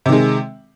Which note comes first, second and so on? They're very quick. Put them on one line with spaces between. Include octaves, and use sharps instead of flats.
C3 D#3 G#3